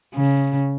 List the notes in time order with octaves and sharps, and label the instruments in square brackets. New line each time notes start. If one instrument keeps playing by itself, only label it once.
[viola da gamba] C#3